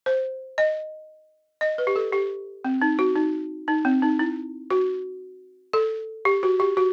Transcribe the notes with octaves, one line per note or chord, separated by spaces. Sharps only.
C5
D#5
D#5
B4
G4
A4
G4
C4
D#4
F#4
D#4
D#4
C4
D#4
E4
F#4
A4
G4
F#4
G4
F#4